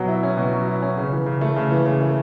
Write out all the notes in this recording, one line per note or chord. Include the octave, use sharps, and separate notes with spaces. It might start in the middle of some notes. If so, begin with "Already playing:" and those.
Already playing: B2 F#3
E4
C#4
B2
F#3
E4
C#4
C#3
E3
C#3
A3
C#3
E3
C#3
A3